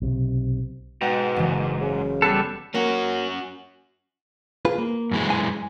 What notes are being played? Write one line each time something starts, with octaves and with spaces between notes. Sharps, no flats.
B1 C3
G#2 B2 F#5 G5
F#1 E3
C#3
G3 B3 A4 F#6 C7
A#3 C#4 F#4
F4 G#4 B4
A#3
F#2 E3 G#3
G#5